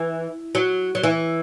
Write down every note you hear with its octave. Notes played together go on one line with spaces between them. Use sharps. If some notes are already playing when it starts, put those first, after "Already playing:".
Already playing: E3
F#3
F#3
E3